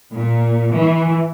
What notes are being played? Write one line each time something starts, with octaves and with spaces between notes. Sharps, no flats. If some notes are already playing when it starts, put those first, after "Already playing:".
A#2
E3